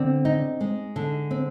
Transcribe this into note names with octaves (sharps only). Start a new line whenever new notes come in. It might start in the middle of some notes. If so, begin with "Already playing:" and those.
Already playing: D3 C4
D#4
G#3
D3
C4